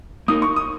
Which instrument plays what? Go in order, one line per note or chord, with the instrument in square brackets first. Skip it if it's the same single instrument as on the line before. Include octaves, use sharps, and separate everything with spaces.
[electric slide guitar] A#3 D#4 A#4 [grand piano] D#6
[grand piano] C#6
D#6